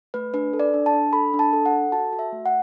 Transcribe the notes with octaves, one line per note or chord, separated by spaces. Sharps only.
A3 B4
D4 B4
A4
D5
D4
A5
D4
A4 B5
D4
A5
A4
F#5
A4
F#4 A5
F#4
E5
A3
F#5